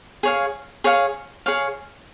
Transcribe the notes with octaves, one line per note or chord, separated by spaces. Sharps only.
G#4 C#5 F5
G#4 C#5 F5
G#4 C#5 F5